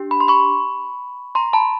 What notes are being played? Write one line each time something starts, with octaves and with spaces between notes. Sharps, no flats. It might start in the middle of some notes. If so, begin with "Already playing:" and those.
Already playing: D4 G4
B5
C6
B5 C#6
A#5 C6
A5 B5